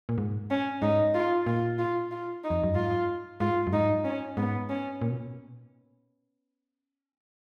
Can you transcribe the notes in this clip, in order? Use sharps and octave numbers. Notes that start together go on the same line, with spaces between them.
A#2
G#2
C#4
G#2 D#4
F4
A#2 F4
F4
F4
D#4
F2
F#2
G#2 F4
G#2 F4
F#2
G#2 D#4
C#4
G#2 B3
C#4
A#2
B2